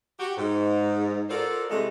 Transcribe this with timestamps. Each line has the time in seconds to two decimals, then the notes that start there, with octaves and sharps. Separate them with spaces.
0.19 F#4 G4
0.37 G#2
1.29 F4 F#4 A4 A#4 C5 D5
1.70 C3 E3 G#3 A3